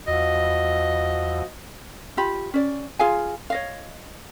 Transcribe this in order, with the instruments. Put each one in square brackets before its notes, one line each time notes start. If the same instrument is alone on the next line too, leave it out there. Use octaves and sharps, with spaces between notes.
[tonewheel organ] E2 [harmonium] F3 F#4 [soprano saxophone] D#5
[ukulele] F4 G4 B5
C#4 D5
F4 G#4 F5 G#5
C#5 D#5 F5